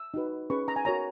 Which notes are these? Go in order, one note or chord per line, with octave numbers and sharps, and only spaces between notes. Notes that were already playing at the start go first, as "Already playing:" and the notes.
Already playing: E6
D#4 F#4 B4
C#4 G#4 B4 C#6
A#5
G#5
F#4 A#4 C#5 A#5